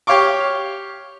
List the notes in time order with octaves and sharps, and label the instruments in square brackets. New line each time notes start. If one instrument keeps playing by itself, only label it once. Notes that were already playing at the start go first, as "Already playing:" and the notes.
[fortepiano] G4 C#5 F5 C#6 D6